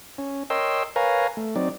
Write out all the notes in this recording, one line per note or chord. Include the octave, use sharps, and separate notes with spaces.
C#4
A#4 C#5 D#5 G5 C6 E6
A#4 B4 C#5 F5 G#5 A#5
A3
F#3 C4 D#4 D5